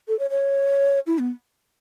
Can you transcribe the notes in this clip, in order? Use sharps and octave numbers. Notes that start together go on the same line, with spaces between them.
A4
C#5
C#5
E4
B3